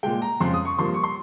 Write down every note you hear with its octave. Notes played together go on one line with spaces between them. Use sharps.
A#2 G#3 G5
A#5
F2 C#3 F3 G#3 C6
D#6
C#6
G2 F3 A#3 C6
C#6
C6